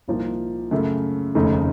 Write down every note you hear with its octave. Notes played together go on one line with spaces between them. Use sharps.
C2 A#2 F3 A#3 D#4
F#2 C#3 A3
F1 D#2 C#3 A3 D#4